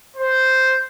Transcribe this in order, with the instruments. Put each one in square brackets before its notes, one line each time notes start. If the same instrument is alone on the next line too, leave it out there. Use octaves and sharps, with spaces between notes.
[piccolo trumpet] C5